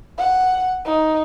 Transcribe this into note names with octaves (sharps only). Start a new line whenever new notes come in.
F#5
D#4